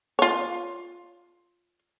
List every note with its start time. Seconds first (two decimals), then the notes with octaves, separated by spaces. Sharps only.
0.19 F4 C#5